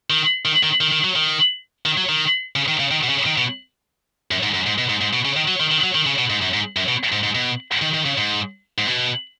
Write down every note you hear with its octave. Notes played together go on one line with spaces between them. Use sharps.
D#3
D#3
D#3
D#3
D#3
F#3
D#3
D#3
F#3
D#3
C#3
D#3
C#3
D#3
B2
C#3
D#3
B2
F#2
G#2
F#2
G#2
B2
G#2
G#2
B2
C#3
D#3
F#3
D#3
D#3
F#3
D#3
C#3
B2
G#2
F#2
G#2
F#2
B2
G#2
G#2
B2
D#3
D#3
C#3
G#2
G#2
B2